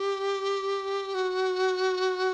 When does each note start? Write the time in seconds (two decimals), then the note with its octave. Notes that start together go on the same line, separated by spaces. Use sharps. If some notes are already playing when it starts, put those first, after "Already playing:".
Already playing: G4
1.14 F#4